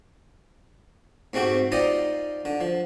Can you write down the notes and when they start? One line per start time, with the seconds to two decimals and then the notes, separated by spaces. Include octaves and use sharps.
1.33 G#2 A3 C4 F#4 G4 G5
1.72 D#4 F4 G4 C5 D5 D#5
2.45 D3
2.61 F3